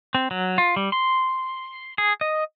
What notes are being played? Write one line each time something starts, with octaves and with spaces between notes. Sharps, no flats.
C4
F#3
F4
G3
C6
G#4
D#5